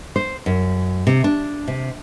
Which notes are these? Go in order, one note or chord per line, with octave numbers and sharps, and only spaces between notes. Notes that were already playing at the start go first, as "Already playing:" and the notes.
C5
F#2
C3
D4
C3